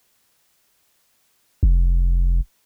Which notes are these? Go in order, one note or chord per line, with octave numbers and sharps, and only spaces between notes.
F1